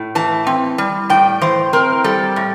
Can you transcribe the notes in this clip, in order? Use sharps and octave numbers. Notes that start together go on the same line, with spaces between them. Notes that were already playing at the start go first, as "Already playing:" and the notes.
Already playing: A2
E3 A5
C4
G3
A2 G5
E3 C5
C4 A#4
G3 A4
A2